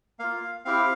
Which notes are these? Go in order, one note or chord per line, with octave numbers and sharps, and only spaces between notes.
A#3 F4 F5
C4 E4 G4 F5